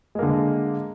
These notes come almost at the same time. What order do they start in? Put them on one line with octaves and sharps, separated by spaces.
G#3 A#3 D3